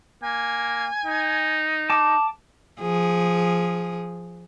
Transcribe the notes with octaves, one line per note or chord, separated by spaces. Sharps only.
A#3 G#5
D#4
A5 D6
F3 G#4